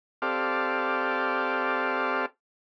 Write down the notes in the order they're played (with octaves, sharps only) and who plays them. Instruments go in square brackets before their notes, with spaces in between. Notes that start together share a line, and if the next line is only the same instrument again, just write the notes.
[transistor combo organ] C4 G4 A4 D5 F5